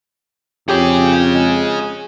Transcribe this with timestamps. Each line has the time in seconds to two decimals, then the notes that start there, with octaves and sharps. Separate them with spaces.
0.69 F2 G4 G#4 C#5
1.35 G#3